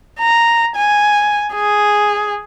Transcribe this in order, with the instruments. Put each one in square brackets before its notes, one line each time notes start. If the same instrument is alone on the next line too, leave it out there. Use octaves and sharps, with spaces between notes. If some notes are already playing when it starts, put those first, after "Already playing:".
[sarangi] A#5
G#5
G#4